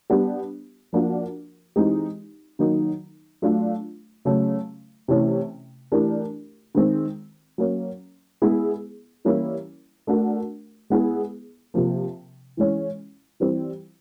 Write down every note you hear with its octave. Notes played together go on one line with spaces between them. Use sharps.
G3 B3 D4 G4
F3 A#3 D4 F#4 A#4
E3 G#3 C4 D#4 G4
D#3 F#3 A#3 D#4
F#3 A3 D4 F4
C#3 F#3 A3 C#4
C3 E3 A3 C#4
E3 A3 D4 G4 A#4
D#3 G#3 C4
F#3 A#3 C#4
G#3 B3 E4 G#4
E3 G3 A#3 C#4 E4
A3 D4 F#4 A#4
G#3 B3 E4 G#4
C3 F3 A#3
E3 G#3 C#4
E3 G3 C4